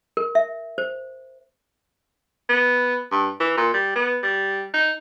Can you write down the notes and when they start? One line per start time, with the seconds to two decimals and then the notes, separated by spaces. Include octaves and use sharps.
0.17 A#4
0.35 E5
0.78 C5
2.49 B3
3.11 G2
3.40 E3
3.57 A#2
3.74 G3
3.96 B3
4.23 G3
4.73 D#4